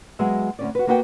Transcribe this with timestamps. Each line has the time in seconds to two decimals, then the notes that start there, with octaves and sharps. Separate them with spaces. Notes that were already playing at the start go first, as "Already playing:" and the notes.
0.19 F#3 G#3 B3 E5
0.59 D2 C#4 D5
0.75 F#4 B4
0.87 A#3 B3 F#4 B4 E5 G5